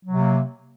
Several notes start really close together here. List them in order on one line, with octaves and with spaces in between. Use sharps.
F#3 C3 A#3